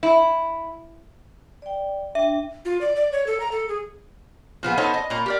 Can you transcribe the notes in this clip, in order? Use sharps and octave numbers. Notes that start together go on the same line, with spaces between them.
E4
D5 G5
D4 E5 G5
F4
D5
D5
C#5
A4
A#5
A4
G#4
A#2 F3 B3 G#4
B3 D#4 A4 C5 C#5 A5
D#5
A#2 C#5 A#5
G4 A#4 D5